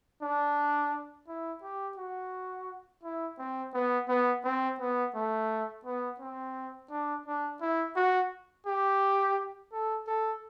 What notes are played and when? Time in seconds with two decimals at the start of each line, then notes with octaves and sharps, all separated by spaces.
0.22 D4
1.28 E4
1.63 G4
1.97 F#4
3.03 E4
3.38 C4
3.74 B3
4.08 B3
4.44 C4
4.80 B3
5.15 A3
5.85 B3
6.19 C4
6.90 D4
7.26 D4
7.61 E4
7.96 F#4
8.67 G4
9.72 A4
10.07 A4